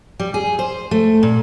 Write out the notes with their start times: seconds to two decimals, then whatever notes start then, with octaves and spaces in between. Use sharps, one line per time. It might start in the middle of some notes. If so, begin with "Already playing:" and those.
0.20 G3
0.34 G#4
0.59 C5
0.91 A3
1.23 A#2